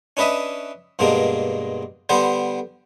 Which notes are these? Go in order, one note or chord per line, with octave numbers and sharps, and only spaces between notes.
C#4 D4 B4 D#5 E5
G2 B2 G#3 A#3 D4
D3 G3 B3 D4 C5